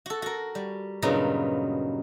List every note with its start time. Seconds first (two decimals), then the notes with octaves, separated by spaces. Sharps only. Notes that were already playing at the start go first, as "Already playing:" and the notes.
0.06 F#4 A4
0.22 F#4 A#4
0.55 G3
1.02 G2 A#2 C#3 F#3 B3 D#4